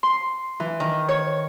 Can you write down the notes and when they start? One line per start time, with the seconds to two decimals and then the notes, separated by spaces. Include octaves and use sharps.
0.03 C6
0.60 E3
0.80 D#3
1.08 C#5